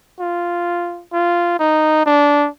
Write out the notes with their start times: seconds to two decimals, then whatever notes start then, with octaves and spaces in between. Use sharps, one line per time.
0.20 F4
1.13 F4
1.59 D#4
2.06 D4